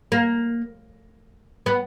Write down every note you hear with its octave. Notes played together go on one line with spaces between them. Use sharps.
A#3
B3